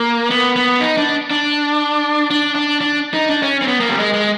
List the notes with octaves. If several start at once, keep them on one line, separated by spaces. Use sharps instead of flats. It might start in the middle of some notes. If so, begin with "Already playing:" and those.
Already playing: A#3
B3
B3
D#4
D4
D4
D4
D4
D4
D#4
D4
C#4
C4
B3
A#3
G3
G#3
G#3